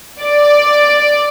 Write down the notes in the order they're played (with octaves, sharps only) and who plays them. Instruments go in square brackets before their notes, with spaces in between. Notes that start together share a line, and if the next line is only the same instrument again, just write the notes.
[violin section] D5